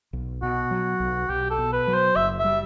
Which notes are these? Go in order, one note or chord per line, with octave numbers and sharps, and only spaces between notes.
B1
B2 F#4
F#3
B1
B1 G4
A4
B2
B4
F#3
C5
F#1 E5
E5
G3